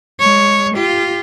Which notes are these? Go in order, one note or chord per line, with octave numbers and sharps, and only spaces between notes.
G#3 C#5
F4 G4